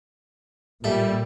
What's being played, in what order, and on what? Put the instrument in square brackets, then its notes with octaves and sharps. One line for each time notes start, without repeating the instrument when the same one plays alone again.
[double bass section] A#2 [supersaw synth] G3 [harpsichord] A4 E5